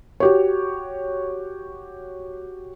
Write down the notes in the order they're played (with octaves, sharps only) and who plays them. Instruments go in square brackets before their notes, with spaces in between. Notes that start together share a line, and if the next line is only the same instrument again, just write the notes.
[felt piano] F#4 G4 C#5